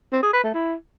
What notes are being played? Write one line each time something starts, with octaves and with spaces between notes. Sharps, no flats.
C4
G#4
B4
A3
E4